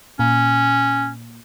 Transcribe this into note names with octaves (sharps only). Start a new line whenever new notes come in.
A#2 C#4